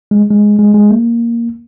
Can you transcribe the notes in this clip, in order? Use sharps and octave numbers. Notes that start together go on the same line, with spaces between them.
G#3
G#3
G#3
G#3
A#3